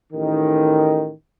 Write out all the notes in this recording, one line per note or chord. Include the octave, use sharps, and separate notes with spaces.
A1 D#3